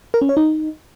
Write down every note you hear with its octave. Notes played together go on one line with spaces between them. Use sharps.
A#4
C#4
C#5
D#4